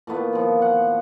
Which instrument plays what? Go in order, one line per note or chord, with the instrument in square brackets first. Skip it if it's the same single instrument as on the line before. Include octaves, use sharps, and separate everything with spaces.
[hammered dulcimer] A#2 A3 B3 E4
D#3 F3
F#5